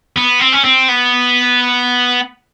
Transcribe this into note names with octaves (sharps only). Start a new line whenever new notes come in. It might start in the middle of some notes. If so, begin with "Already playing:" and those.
B3
C4
C#4
C4
B3